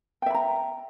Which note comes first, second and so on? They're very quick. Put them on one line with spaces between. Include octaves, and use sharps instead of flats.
G5 E5 B5 A#5